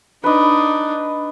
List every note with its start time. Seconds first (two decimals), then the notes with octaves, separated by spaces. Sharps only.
0.24 D4 D#4 B4 D#5